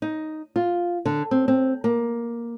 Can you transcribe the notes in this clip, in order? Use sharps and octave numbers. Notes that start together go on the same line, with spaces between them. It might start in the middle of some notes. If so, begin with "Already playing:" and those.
D#4
F4
D3
C4
C4
A#3